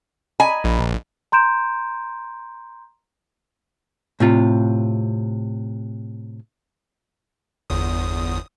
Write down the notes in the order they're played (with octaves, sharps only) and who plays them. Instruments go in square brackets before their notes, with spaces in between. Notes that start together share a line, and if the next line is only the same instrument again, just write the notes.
[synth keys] D#5 A#5 B5 [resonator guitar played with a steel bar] G#5
[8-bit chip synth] A#1
[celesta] A#5 C6 G6 D7 E7
[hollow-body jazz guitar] A2 C3 F4
[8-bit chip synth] G1 E2 D#6